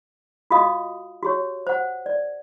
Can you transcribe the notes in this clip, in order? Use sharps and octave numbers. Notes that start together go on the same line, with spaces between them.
F4 F#4 D#5 F5 D#6
F#4 G4 C#5
C5 F#5
D5